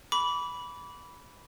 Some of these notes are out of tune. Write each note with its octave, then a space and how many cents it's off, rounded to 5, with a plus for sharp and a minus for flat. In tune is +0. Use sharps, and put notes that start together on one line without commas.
B5 -5 D6 -30